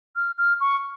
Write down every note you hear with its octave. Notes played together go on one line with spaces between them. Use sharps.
F6
F6
C#6